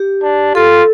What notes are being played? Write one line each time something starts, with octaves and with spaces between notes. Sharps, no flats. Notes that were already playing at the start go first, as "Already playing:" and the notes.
Already playing: G4
D4
F4 A4